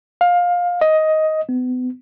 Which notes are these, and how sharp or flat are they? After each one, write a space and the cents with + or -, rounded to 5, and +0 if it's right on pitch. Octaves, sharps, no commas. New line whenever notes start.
F5 +20
D#5 +10
B3 +35